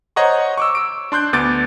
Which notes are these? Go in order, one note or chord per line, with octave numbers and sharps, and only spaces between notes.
C5 C#5 D#5 F#5 A#5 C#6
C#6 D6 E6
E6 D7
D4 C6 F#6 G6
D2 B3 D6 G6 A6 D7